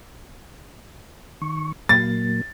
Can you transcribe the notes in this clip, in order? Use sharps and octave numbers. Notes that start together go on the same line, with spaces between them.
D#3 C#6
A#2 F#3 A#3 A6